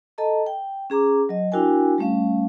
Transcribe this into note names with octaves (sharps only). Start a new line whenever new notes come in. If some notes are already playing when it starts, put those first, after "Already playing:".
A4 D#5 A5 A#5
G5
C#4 G#4 A#5 D6
F#3 D#5
D4 E4 F#4 A#4 G5 G#5
G3 A3 C#4 F5